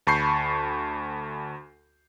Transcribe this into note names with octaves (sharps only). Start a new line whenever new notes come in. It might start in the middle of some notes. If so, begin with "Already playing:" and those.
D2 A5 B5 C#6 G6 C7